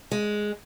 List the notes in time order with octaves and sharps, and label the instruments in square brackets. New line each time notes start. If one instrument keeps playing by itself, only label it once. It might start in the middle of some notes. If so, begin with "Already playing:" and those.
[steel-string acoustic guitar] G#3